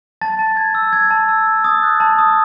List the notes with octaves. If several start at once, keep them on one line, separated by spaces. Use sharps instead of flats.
A5 A6
A5
A5 G#6
E6
E6 G#6
A5
E6
E6
D#6 A6
F#6
A5
D#6